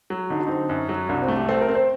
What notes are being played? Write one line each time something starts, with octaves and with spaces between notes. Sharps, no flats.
F#3
D3 D#4
F#4
C4 D#4
F#2
F#3
C2 D4
C4
A3
G4
C4 A4
A#4
C4
C5